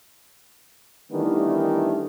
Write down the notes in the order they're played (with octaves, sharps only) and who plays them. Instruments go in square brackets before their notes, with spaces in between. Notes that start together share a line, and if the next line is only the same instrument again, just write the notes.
[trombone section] D#3 E3 G3 A3 B3 D4